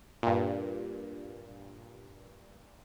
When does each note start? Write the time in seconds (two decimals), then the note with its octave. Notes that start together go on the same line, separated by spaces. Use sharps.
0.23 G2 A#2